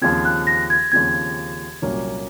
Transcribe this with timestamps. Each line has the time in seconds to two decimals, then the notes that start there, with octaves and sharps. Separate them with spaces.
0.02 D#2 C#3 F3 C4 G#6
0.25 F#6
0.47 A#6
0.70 G#6
0.92 D#2 C#3 F3 C4 G#6
1.82 C2 A#2 F#3 A#3 C#4